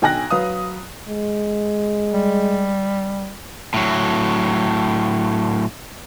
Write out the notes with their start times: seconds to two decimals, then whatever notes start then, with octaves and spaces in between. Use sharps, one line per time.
0.02 B1 G5 G#5 F#6 A#6
0.30 F#3 B4 F5 D#6
1.09 G#3
2.13 G3
3.74 A2 F#3